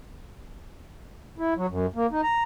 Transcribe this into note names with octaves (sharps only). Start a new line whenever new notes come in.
E4
F#3
F#2
A#3
D#4
A#5